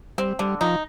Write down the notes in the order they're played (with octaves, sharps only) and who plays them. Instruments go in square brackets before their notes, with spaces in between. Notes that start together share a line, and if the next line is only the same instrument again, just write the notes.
[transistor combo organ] G3 [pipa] C4
[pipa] D3 [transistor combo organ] G3
[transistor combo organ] F3 [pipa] D#4